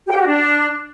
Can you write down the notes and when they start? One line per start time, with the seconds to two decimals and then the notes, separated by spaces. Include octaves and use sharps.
0.06 G4
0.11 G5
0.16 G4
0.21 F#4
0.26 D4